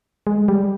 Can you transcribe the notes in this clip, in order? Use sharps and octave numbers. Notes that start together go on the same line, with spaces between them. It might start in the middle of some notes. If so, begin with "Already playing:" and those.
G#3
G3